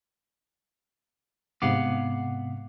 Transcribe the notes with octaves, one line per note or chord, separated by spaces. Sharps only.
G#2 C3 B3 F5 F#5 D6